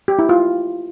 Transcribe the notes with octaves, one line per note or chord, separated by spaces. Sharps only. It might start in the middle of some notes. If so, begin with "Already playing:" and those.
G4
E4
F4